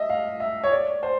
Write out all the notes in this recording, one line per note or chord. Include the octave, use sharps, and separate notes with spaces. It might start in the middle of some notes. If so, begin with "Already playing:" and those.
Already playing: D#5 E5
F5
E5
C#5
D5
C5